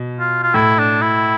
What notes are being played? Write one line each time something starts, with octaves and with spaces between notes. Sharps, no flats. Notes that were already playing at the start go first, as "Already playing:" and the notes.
Already playing: B2
F4
F4
A2 E4
D4
E4